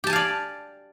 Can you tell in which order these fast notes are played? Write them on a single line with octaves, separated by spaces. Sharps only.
G4 A5 G#5 F5 D5